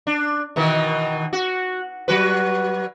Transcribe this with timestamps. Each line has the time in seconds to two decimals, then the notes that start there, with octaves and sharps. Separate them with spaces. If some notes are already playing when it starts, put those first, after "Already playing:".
0.07 D4
0.56 B2 D#3 E3
1.33 F#4
2.08 F#3 F#4 B4